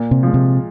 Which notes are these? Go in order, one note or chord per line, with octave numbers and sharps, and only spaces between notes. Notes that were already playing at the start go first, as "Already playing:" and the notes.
Already playing: A#2
C3
F3 G#3
C3